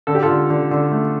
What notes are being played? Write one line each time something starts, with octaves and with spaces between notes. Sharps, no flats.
D3 A4
G4
F4 A4
D3
D3
D3
A3